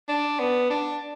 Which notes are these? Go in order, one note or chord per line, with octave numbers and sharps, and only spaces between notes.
D4
B3
D4